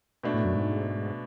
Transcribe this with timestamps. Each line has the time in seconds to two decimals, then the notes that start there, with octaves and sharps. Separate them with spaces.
0.23 B2 A3 D4
0.34 A2
0.45 F#2
0.55 G#2